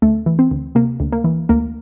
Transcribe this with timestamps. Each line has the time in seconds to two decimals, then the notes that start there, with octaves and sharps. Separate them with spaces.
0.02 D2 A3
0.26 E3
0.39 C4
0.51 D2
0.75 C3 A#3
1.00 D2
1.13 A#3
1.24 E3
1.49 D2 A#3